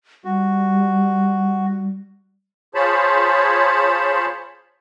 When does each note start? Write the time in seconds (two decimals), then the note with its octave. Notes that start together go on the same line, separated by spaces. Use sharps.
0.24 G3 F#4
2.75 F4 G#4 C5 C#5 A5 B5